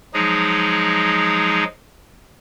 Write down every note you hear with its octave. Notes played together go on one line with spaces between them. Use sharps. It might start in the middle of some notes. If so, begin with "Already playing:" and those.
F3 F#3 G#3 D#4 G#4